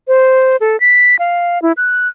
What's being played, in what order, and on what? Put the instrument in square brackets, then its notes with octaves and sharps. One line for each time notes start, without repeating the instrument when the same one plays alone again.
[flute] C5
A4
B6
F5
E4
F#6